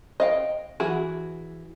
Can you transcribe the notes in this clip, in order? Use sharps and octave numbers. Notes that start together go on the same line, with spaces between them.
D#5 F5 G5
E3 F#4 G#4